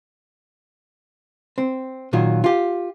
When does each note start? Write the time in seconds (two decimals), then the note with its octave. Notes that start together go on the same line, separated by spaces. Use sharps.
1.58 C4
2.13 A#2 D#3 F#3 F4
2.44 F4 G4